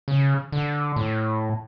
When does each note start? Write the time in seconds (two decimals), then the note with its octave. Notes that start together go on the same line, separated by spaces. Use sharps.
0.08 C#3
0.52 D3
0.96 A2